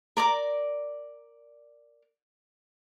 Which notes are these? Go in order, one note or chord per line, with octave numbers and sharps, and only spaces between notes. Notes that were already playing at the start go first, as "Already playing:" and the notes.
A#4 D5 A#5 D6